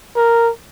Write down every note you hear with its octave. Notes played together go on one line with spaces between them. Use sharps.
A#4